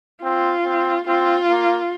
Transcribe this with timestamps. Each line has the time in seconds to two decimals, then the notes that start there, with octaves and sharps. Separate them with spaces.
0.23 C4 F4
0.65 C4
1.08 C4 F4
1.49 A#3